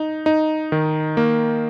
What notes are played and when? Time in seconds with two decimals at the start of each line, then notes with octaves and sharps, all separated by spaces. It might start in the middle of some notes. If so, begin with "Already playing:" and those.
Already playing: D#4
0.26 D#4
0.72 D#3
1.17 A#3